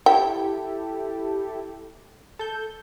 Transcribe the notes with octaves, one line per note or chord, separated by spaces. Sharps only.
E4 G4 A4 G5
A4 G6